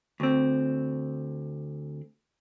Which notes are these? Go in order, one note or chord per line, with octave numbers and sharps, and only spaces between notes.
D2 C4